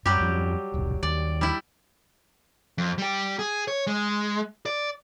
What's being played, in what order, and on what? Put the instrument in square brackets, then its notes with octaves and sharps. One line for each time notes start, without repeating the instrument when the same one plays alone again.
[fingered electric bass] F#2 [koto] F#3 G3 G4
[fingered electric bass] F2 F3 C#4
D#1 B1
[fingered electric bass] D#2 [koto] D5
[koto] G3 E4
[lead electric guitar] F2
G3 G4
G#4
C#5
G#3
D5